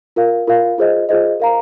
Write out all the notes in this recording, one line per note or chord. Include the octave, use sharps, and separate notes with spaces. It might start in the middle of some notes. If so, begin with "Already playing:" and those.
F4 A#4 F5
F4 A#4 F5
F4 G#4 C5 D#5
F4 G#4 C5 D#5
A#4 F5 A#5